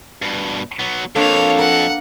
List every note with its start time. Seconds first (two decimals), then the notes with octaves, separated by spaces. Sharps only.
0.22 G2 B2
0.79 F#3 B3
1.16 F2 A#3 D4 A4 B4 C#5 F5
1.59 A#4 F#5